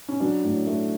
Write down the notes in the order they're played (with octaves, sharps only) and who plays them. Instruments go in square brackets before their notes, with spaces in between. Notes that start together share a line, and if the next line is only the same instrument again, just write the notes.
[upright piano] C#4
F#3 D4
A2
A3